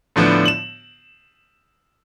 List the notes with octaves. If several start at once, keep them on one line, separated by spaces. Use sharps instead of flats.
A2 D3 F3 B3 D4
E7 F#7